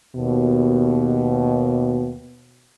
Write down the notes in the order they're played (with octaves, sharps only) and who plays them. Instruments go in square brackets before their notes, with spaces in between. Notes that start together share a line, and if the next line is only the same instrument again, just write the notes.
[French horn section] D#2 B2